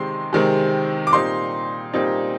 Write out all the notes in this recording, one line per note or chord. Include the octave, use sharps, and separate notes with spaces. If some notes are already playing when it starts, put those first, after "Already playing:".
Already playing: C3 D#3 G#3 C4 C6
C3 D#3 G#3 C4
D6
A#2 G3 C4 D#4 C6
A#2 G3 C4 D#4